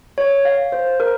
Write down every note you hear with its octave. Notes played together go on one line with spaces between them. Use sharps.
C#5
F5
C5
A#4